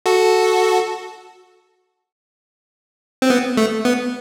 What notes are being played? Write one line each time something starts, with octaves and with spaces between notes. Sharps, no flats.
F#4 A4
C4
B3
A3
B3